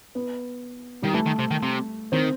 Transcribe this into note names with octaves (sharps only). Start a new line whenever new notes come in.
B3
D#3 G3
E3 A3
D#3
C3
D#3
C3
D#3 C4